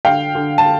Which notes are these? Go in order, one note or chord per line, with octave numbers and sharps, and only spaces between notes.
D3 F5 G5
D3
A5